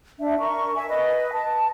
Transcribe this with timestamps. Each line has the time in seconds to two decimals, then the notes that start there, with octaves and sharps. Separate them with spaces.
0.19 D4 E5
0.39 A#4 C#6
0.75 E5 G#5
0.88 B4 D#5
1.32 A5